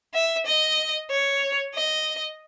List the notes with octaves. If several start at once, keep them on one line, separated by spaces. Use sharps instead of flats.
E5
D#5
C#5
D#5